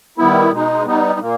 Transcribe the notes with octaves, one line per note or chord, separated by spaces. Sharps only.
D#3 G3 B3 E4
B2 G#3 D#4
G3 B3 D#4
A#2 A#3